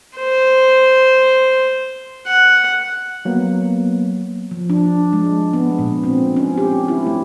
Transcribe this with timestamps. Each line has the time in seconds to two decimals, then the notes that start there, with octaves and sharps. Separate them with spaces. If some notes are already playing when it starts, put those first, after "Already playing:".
0.17 C5
2.27 F#5
3.25 F#3 A#3 B3
4.51 F3
4.70 D4
5.13 G#3
5.53 B3
5.79 A#2
6.04 C4
6.37 C#4
6.58 G4
6.88 E4
7.07 A3